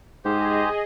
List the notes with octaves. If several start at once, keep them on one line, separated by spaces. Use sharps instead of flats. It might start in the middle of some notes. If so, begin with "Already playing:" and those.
G#2 G4 G#4 C5 D#5